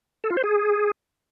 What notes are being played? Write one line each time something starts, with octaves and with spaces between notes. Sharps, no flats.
A4
F4
C5
G#4